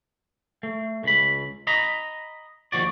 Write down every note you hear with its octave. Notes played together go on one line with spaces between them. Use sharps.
A3
C#2 B5
D#5 A#5 B5
D#2 F3 F#4 D5